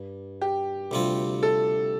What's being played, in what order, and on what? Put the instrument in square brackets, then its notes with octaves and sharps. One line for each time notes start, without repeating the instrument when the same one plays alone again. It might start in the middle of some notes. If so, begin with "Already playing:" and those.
Already playing: [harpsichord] G2
[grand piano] G4
[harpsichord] D2 C3 G3 C4 F4
[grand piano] A4